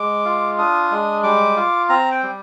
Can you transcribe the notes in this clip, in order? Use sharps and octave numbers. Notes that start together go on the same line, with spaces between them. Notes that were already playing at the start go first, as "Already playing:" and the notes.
Already playing: G#3 D6
F4
D4 D#6
G#3
G3 D6
F4
C4 A#5
G5
G3